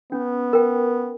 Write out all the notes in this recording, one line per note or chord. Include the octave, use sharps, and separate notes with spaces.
B3 C#4
A#4 G5